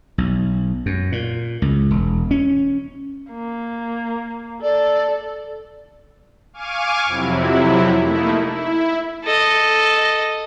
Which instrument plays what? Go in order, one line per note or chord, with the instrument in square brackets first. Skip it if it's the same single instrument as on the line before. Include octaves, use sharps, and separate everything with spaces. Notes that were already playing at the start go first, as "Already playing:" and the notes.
[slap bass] B1
F#2
A#2
C#2
E1
C#4
[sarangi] A#3
[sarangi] A4 [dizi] D5
[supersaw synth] F5 G#5 C#6 D6 F6 D#7
F2 C3 F#3 E4
A3 A#3 D#4 E4
E4
[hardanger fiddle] A4 D#5